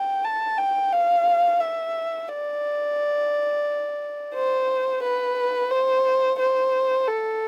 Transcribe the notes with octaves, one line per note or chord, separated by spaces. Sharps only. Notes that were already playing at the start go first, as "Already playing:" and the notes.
Already playing: G5
A5
G5
F5
E5
D5
C5
B4
C5
C5
A4